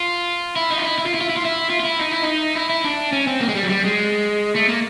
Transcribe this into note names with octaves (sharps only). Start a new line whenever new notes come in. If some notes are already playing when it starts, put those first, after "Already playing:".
Already playing: F4
E4
D#4
F4
E4
E4
F4
E4
F4
E4
F4
E4
F4
F4
E4
D#4
E4
D#4
E4
E4
D4
C#4
C4
A#3
G#3
G3
F#3
G3
G#3
A3
A#3